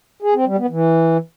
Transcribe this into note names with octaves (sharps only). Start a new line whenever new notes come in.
G#4
C4
G3
B3
E3